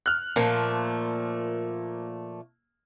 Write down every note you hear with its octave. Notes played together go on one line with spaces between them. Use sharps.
F6 F#6
A#2 F3 A3 A#3